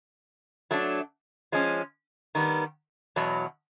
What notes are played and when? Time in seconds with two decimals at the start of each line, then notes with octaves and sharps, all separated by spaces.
0.71 F#3 A3 D4
1.52 F3 G#3 C#4
2.35 D#3 G3 B3
3.16 E2 B2 F#3